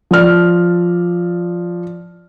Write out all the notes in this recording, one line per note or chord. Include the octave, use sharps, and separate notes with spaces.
F3 D5 F6